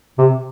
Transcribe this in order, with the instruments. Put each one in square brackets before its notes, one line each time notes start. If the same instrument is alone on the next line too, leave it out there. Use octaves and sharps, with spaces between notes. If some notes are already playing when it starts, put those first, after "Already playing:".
[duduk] C3